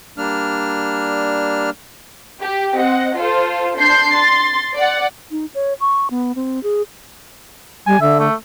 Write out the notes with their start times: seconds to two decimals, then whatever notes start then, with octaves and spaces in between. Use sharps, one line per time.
0.18 G3 A#3 D4 F6
2.41 G4
2.76 C4 D#5 F#5
3.15 F4 A4 C5
3.78 D4 C6 G6 C7
4.14 C6 A6
4.76 D5 F#5
5.31 D#4
5.54 C#5
5.81 C#6
6.10 B3
6.35 C4
6.63 G#4
7.87 G3 G#5
8.01 D3 E5
8.19 A3